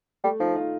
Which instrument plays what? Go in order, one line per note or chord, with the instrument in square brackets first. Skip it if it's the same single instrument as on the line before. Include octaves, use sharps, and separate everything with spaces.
[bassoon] G3 [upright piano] A3
[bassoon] F3 [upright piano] D#4
[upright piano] F4